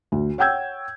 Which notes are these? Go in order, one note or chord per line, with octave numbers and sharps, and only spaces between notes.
D2
C#5 F#5 G5 E6 G6 G#6